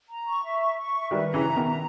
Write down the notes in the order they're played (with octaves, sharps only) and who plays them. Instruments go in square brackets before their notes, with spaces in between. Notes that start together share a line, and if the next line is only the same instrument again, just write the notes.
[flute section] A#5
C#6
E5
C#6
C#6
E5
[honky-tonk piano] D#3 G3 [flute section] B4
[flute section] A#5
[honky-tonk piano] C#3 E3
[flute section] E5
[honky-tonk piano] B2 D#3
[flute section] A#5